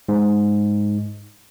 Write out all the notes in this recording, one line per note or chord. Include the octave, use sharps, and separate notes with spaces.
G#2